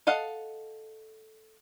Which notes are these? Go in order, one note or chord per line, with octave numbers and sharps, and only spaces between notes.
A4 D#5 F5 F#5